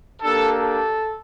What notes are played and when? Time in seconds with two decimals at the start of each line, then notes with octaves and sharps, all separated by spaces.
0.22 A#3 D4 G4 A4
0.53 A4